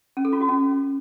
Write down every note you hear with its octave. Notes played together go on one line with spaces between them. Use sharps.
C#4
A4
F4
F#4
C#4